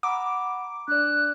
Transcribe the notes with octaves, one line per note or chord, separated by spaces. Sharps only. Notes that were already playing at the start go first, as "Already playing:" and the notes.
F#5 A#5 B5 D6
D4 D5 F#6